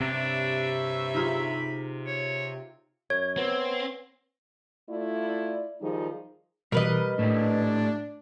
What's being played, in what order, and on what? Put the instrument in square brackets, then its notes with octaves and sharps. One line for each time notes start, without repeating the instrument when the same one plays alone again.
[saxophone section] G2 C#5 E5 [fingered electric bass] C3 [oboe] D4
[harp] D#4 F4 G#4 [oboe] B5
[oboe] C#5
[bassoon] F#2 [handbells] C#5 [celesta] G#6
[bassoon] B3 [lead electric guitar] C4
[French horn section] A3 E4 F4 D5
D#3 F3 G3 D#4 G#4
[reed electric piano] B2 E3 [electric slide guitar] G3 [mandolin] A#4 B4 D#5
[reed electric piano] A2 [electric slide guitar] A3 E4 G4 [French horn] D4